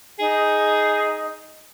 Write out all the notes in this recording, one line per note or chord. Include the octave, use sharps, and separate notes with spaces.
D#4 G#4